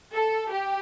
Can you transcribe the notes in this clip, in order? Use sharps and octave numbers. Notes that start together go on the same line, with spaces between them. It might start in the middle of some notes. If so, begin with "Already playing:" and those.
A4
G4